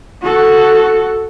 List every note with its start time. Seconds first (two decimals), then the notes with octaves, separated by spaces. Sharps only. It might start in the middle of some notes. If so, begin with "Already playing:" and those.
0.23 F#4 A4